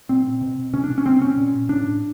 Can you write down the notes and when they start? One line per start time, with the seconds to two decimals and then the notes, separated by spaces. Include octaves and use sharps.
0.09 A#2 C4
0.41 B2
0.73 B2 C#4
0.84 D4
0.98 C#4
1.06 B2 C4
1.22 C#4
1.37 A#2
1.69 A2 D4